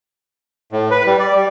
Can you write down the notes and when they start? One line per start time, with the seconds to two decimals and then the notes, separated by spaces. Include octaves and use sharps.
0.72 A2
0.91 B4
1.06 G3
1.19 D5
1.35 G3